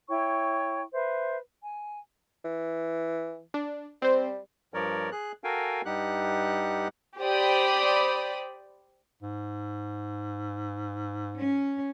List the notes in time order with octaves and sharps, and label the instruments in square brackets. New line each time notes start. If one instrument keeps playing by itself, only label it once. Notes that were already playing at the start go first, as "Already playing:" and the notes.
[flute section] E4 C#5 G5 C#6
B4 C5 E5
G#5
[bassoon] E3
[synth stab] D4
[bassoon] G3 [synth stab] C4 C5
[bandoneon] G2 F3 A#4 C#5 D5
G#4 F#6
F#4 A4 A#4 F5 G5 G#5
G2 G3 D#4 G4 F#5 F#6
[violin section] G4 C5 D5 G5 B5 D#6
[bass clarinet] G#2
[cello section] C#4